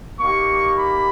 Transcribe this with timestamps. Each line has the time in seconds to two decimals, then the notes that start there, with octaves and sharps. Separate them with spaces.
0.18 A#3 D#4 G4 C#6
0.78 B5